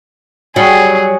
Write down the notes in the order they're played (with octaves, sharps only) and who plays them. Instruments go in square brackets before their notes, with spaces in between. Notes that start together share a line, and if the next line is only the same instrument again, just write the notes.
[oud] F#3 G3 [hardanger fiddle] G#4